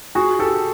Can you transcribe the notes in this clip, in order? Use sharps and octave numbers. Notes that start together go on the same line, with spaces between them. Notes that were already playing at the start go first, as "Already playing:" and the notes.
F#4 G#4
G4 A4